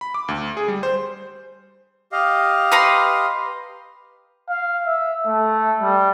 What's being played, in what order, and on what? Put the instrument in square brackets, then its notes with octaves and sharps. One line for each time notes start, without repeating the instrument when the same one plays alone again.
[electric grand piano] B5
D6
D2
G#4
G3
C5
[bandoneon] G4 D#5 [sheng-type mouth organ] F5
[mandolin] B4 A#5 C6
[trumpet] F5
E5
A3
G3